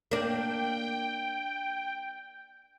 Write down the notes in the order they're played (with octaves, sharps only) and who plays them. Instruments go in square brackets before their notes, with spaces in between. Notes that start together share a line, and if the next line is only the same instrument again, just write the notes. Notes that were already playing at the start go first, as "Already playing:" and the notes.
[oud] A#3 D4 [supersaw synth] G5